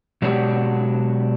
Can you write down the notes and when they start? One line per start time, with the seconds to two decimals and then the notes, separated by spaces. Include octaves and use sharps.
0.22 B2 F#3 G#3 D4 F#4 G4